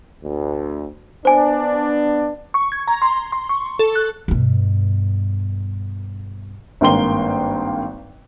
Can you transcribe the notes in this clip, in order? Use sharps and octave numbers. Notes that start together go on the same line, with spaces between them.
D2
B3 D4 C5 G#5
C#6
G#6
A#5
C6
C6
C#6
A4
F#6
G2 B2
G#1 G2 A#3 G5 C6 G7